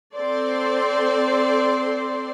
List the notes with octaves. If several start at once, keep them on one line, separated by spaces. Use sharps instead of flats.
C4 A4 C5 D5 C6